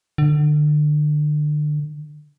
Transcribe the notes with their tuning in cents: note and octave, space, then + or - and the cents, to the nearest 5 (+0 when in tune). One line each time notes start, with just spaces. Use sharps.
D3 +30